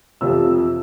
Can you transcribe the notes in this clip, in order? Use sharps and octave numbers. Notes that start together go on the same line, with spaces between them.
F2 C3 F3 E6